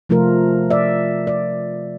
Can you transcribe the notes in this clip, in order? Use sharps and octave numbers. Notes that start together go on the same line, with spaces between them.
C3 F3 A3 F4 A#4
D5 E5
D5